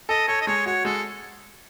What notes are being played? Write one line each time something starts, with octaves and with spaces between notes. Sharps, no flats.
A4 D#5
A4 C#5
D#5
G#3 C#5
F#4 C#5
G#3 A4